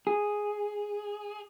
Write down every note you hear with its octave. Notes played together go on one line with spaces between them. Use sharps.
G#4